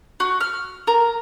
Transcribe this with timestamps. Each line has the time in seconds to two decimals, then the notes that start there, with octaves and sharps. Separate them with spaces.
0.20 F#4
0.41 F6
0.87 A#4